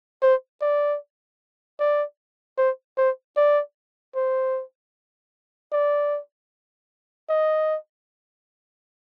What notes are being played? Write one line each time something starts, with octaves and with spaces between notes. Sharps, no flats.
C5
D5
D5
C5
C5
D5
C5
D5
D#5